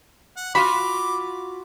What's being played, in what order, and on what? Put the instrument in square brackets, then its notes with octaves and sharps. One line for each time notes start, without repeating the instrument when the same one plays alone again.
[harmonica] F#5
[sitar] F4 F#4 [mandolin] B5 [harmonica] D6